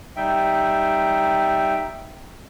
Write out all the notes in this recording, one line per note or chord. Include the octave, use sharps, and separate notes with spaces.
G3 D#4 E5 G5